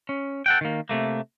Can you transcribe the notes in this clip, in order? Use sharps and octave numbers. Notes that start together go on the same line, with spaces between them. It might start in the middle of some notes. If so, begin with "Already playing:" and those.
C#4
A4 F#5 G5
D#3 A#3
C3 A3 A#3